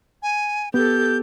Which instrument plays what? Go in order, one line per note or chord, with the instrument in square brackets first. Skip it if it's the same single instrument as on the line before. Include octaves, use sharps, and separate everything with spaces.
[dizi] G#5
[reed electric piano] B3 [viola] G4 A4 [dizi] G6